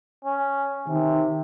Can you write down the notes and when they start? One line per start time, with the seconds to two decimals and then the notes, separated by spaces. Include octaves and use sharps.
0.25 C#4
0.88 C3 D#3